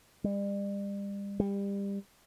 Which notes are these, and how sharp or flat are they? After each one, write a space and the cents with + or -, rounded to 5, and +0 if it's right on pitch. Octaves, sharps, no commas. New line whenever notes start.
G3 +35
G3 +25